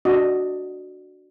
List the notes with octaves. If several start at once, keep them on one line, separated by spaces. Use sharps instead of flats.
D4 F#4 D#5